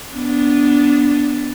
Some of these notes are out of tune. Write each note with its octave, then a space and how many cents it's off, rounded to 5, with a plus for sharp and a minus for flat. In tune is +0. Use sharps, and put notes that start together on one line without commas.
B3 +0 D4 -10